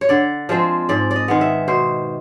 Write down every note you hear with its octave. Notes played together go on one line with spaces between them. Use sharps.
C#5
D3 D5
F3 G#3 C4
G#2 D5
D5
D#5
D#3 G#3 B3
E5
B2 C5